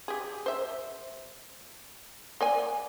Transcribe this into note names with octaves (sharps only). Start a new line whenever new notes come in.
G4 G#4
C5 E5
A#3 D5 G#5